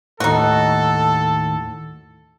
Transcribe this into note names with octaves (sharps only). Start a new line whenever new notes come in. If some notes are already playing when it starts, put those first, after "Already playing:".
D#2 A2 D#4 F#4 A4